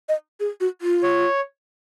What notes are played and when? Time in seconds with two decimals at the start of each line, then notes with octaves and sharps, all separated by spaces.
0.09 D#5
0.40 G#4
0.61 F#4
0.81 F4
1.03 C#5